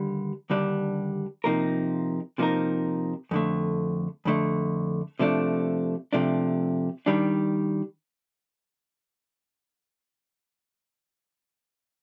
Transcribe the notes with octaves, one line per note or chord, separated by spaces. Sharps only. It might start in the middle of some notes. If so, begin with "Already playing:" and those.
Already playing: D#2 D3 G3
D#2 D3 G3 D4
C3 F3 A#3 D#4 A#4
C3 F3 A#3 D#4 A#4
F2 D3 A3
F2 D3 A3
C3 F3 A3 D4
C3 F3 A3 D4
D#3 G3 D4